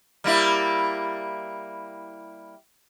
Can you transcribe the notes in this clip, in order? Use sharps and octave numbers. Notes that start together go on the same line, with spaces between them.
G3 A#3 E4